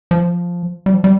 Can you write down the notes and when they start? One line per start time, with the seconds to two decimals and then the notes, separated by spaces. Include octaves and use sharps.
0.11 F3
0.86 G3
0.94 F3
1.04 G3